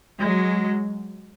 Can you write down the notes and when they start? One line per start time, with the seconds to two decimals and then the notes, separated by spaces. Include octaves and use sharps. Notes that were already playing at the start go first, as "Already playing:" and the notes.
0.22 F#3 G#3